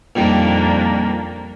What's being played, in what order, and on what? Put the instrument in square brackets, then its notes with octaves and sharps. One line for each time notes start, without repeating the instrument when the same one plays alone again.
[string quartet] F2 A#3 D4 [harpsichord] A#2 D#3 G3